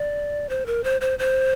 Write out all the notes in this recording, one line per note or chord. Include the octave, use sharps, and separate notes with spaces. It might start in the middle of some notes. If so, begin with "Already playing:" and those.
Already playing: D5
C5
A#4
C5
C5
C5